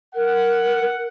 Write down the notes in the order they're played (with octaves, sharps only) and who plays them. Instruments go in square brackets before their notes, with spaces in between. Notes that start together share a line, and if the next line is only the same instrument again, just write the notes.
[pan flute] A#4 [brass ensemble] F#5